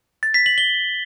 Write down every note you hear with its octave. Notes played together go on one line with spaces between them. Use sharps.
A6
B6
F#7
G7